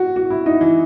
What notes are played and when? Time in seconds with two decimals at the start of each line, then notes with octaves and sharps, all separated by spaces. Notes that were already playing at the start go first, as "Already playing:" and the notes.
Already playing: F#4
0.16 F#4
0.30 E4
0.46 D#4
0.61 E3